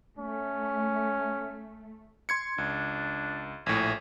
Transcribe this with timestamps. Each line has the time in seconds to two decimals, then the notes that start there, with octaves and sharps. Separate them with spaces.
0.19 A3 C#4
2.29 C6 G#6 C#7
2.58 C#2 D4
3.66 A#1 A2 G#5